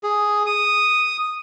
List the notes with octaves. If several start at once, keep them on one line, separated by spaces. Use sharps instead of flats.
G#4
D#6